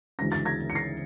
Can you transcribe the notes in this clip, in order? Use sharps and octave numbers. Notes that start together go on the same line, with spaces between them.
D2 C#3 E3 G#3 C#4 A#6
A6
G#6 A#6
C#7
A#6 C7